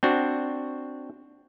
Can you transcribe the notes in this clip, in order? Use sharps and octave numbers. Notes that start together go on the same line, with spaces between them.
C4 D4 F#4